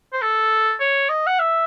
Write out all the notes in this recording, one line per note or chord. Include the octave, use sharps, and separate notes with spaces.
C5
A4
C#5
D#5
F#5
E5